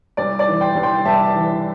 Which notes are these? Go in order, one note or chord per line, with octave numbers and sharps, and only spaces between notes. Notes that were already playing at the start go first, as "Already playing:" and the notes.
C2 D5
D5
E3
G5 C6
C2
G5 C6
C2 E5 A5
E3